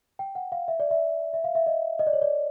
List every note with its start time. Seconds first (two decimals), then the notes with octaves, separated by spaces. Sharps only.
0.19 G5
0.35 F#5
0.52 F5
0.68 E5
0.80 D5
0.91 E5
1.34 E5
1.44 F5
1.55 E5
1.66 D#5
1.99 D#5
2.07 D5
2.13 C#5
2.22 D5